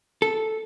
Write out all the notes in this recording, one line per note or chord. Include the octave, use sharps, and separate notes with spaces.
A4